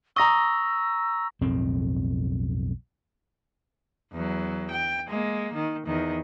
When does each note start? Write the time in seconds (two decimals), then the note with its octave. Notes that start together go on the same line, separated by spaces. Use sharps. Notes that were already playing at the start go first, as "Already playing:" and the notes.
0.16 A#5 C#6 D#6 E6 A#6
1.41 B1 F2 A2 C4
4.13 E2 F#3
4.71 G5
5.09 G#3 A#3
5.54 D#3
5.87 E2 D#3